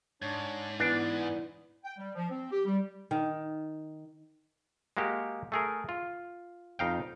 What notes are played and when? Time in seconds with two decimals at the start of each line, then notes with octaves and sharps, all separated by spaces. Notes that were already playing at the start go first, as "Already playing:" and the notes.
0.22 G#2 D4 C#5
0.80 E3 B3 D4
1.85 G5
1.98 G3
2.15 F3
2.30 C4
2.52 G4
2.65 G3
3.11 D#3
4.97 G#3 A#3 F#4 G4
5.52 A3 G#4 A#4
5.89 F4
6.79 F2 D#4 F5 G5